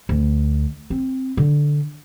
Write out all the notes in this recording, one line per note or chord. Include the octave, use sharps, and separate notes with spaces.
D2
C4
D3